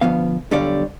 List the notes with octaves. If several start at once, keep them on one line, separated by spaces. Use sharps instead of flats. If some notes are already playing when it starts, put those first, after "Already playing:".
D2 B2 F3 B3 F5
B1 D3 G3 C#5 D5 F5